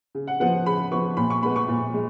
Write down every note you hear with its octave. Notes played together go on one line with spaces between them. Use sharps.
C#3
F#5
F3 B3 F#5
C#3 B5
F3 B3 C#6
A#2 B5
C#6
G#3 B3 B5
C#6
A#2
G#3